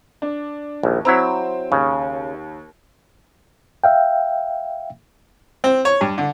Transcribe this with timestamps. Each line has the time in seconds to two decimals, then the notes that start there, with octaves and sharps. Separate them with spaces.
0.22 D4
0.83 A#1 D#2
1.05 F#3 C4 E4 A#5
1.72 D#2 C#3
3.84 E5 F5 G5
5.64 C4
5.85 C#5
6.01 G2
6.18 D3